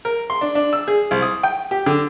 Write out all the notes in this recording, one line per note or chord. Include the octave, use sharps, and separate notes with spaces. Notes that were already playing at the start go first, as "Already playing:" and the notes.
A#4
C6
D4
D4
E6
G#4
C2
D#6
G5
G4
D3